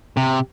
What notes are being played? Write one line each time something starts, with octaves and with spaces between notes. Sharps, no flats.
C3